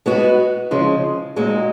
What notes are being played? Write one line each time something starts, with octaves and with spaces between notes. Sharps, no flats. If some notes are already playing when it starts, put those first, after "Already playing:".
G#3 B3 F#4
C#3 F3 G#3
A#2 G#3 D#4 F#4